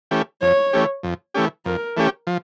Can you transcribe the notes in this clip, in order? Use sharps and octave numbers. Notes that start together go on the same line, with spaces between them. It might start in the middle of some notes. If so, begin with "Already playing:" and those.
E3 A3 C#4 G4
F2 C#5
E3 A3 C#4 G4
F2
E3 A3 C#4 G4
F2 A#4
E3 A3 C#4 G4
F3